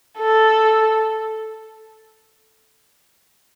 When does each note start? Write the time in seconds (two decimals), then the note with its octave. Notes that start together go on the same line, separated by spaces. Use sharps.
0.19 A4